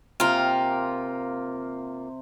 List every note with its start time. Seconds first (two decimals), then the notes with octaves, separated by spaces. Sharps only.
0.20 C3 A#3 F4 G5 G#5